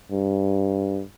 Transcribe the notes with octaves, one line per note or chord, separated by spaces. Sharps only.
G2